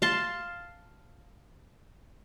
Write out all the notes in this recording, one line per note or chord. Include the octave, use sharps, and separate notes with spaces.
F5 A5 C6